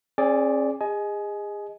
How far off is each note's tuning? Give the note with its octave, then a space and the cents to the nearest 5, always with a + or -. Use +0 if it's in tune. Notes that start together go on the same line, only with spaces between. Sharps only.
C#4 -45 G#4 +10 D5 +0
G#4 -30 D#5 +0 G#5 +25